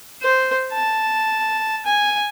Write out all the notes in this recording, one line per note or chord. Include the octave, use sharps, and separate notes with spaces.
C5
A5
G#5